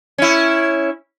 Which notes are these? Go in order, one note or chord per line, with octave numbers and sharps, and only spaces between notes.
C#4 E4